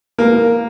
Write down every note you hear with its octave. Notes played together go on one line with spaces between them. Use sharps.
A#3